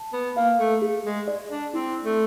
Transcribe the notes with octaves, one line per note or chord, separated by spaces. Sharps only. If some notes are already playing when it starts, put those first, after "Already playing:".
Already playing: A5
B3
A#3 F5
A3
G#4
G#3
D5
D4
C4 E4
A3